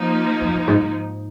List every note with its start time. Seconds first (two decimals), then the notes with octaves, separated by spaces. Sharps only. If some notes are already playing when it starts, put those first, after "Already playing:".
Already playing: D#3 F3 A#3 D#4
0.41 F2
0.54 F2
0.67 G#2
0.80 G#2